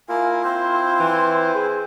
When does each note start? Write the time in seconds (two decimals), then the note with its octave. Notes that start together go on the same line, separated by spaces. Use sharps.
0.09 A#3 E4 F4 A#4 G#5
0.44 C4 E4 C5 C6
1.00 E3
1.54 G#4